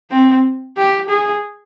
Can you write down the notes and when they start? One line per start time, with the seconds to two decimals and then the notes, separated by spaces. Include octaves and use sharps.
0.11 C4
0.77 G4
1.09 G#4